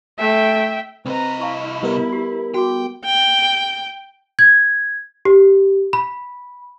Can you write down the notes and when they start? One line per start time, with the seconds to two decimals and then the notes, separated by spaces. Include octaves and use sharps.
0.19 A3 E5 G5
1.06 C2 C4 B4 D#5 A#5
1.41 E4 F5 A5 C#6
1.83 G3 B3 A#4
2.12 G4
2.54 F#4 G#4 G5
3.05 G5
4.39 G#6
5.25 G4
5.93 B5